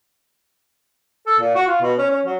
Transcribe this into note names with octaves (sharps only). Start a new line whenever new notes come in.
A4
A#2
F#4
F4
B2
C#4
C#4
F#3